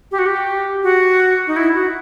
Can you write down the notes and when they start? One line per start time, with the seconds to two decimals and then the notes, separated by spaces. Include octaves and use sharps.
0.12 G4
0.19 F#4
0.26 G4
0.83 F#4
1.47 D#4
1.56 E4
1.74 F#4